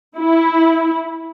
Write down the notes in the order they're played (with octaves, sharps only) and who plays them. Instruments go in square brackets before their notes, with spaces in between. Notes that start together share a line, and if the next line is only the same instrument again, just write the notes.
[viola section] E4